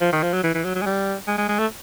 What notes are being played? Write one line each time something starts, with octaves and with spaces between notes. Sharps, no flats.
F3
D#3
F3
F#3
E3
E3
F#3
F#3
G#3
G3
G#3
G#3
G#3
A3